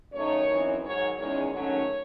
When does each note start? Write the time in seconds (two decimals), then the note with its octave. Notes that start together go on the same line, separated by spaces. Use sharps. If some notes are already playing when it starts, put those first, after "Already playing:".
0.13 F#2 D#3 A3 D#4 C#5
0.48 F#2 E3 C4 D#4
0.83 G#2 D#3 F#3 C#5
1.17 E2 D#3 G#3 C#4 C#5
1.52 G#2 D#3 F#3 A3 C#4 C#5